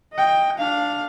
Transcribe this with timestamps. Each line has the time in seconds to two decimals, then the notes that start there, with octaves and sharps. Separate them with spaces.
0.14 D#5 G5
0.58 D4 F5